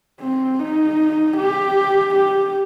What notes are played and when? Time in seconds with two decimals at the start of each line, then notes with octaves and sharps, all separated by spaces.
0.21 C4
0.60 D#4
1.37 G4
2.14 G4